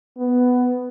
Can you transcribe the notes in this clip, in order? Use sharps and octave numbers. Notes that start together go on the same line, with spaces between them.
B3